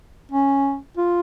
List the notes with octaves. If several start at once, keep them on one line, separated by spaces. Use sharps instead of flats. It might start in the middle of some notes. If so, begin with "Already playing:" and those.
C#4
F4